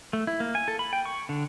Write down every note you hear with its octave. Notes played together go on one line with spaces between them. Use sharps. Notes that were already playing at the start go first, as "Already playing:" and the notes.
A3
E4
A#3
G#5
A4
B5
G5
C#6
D3